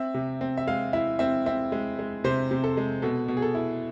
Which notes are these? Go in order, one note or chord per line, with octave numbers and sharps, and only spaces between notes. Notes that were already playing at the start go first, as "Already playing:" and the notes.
Already playing: C4 E5
C3
C4
E5
G#3 F5
E4 E5
C4 E5
C4 E5
G#3
G#3
C3 C5
C3
A4
G#3
B2 A4
B2
G#4
A4
E4